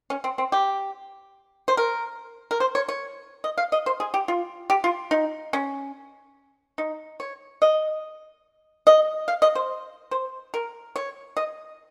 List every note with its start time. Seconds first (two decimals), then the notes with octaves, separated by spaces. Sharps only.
0.10 C#4
0.24 C4
0.38 C4
0.52 G4
1.68 C5
1.77 A#4
2.51 A#4
2.60 C5
2.75 C#5
2.89 C#5
3.44 D#5
3.58 F5
3.72 D#5
3.86 C5
4.00 G#4
4.14 G4
4.28 F4
4.70 G4
4.84 F4
5.11 D#4
5.53 C#4
6.78 D#4
7.20 C#5
7.62 D#5
8.87 D#5
9.28 F5
9.42 D#5
9.55 C5
10.11 C5
10.54 A#4
10.96 C#5
11.37 D#5